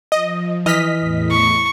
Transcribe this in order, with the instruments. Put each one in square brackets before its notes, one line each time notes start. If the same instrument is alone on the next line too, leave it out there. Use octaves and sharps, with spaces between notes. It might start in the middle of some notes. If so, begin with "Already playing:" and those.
[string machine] F3 [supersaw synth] D#5
[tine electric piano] E3 F6 [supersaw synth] D#5 B6
[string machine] E2 A2
[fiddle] C#6